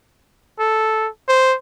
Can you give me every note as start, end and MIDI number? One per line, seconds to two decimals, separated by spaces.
0.59 1.08 69
1.28 1.56 72